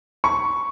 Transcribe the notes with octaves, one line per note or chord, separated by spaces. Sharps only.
C#6